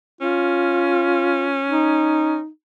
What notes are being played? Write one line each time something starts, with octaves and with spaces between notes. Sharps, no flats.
C#4 F4
D#4